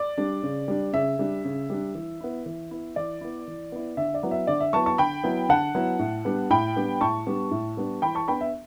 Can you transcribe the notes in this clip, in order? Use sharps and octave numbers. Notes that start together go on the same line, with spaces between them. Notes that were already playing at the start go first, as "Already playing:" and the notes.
Already playing: D5
G3 D4
C#3
G3 D4
C#3 E5
G3 D4
C#3
G3 D4
E3
B3 E4
E3
B3 E4
E3 D5
B3 E4
E3
B3 E4
D3 E5
D5
F#3 B3 E4
E5
D3 D5
E5
F#3 B3 E4 A5 C#6
A5 C#6
D3 G5 B5
F#3 B3 E4
D3 F#5 A5
F#3 B3 E4
A2
G3 B3 D4
A2 G5 B5
G3 B3 D4
A2 A5 C#6
G3 B3 D4
A2
G3 B3 D4
E3 G5 B5
A5 C#6
B3 D4 G5 B5
E5